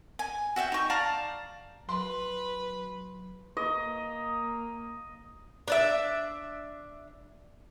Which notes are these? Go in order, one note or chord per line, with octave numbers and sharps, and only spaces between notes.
G#5
F#4 E5 F5 G5
D#4 C#6
D5 F5 A5 A#5
F#3 B4 C6
A#3 D#5
D4 D5 E5